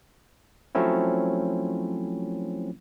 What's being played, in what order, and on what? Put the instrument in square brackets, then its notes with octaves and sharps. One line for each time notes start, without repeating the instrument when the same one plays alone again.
[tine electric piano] F3 F#3 A3 C4 C#4 E4